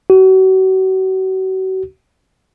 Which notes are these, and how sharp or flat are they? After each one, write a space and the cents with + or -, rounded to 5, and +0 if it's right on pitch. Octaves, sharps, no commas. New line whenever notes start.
F#4 +35